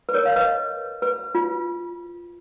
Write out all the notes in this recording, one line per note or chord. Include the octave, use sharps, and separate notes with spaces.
B4
A#4 C#5
F5
B4 D#5
B4
F4